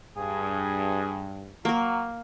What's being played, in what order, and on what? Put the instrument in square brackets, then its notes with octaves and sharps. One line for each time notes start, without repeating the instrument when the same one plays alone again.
[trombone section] G2 [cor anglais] G#4
[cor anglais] F#3 [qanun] A#3 A#4